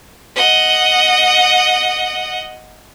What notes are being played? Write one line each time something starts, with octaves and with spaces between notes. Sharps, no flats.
D#5 F#5